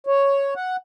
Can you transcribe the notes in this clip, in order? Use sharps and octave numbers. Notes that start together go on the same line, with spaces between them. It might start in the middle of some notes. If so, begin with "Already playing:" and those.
C#5
F#5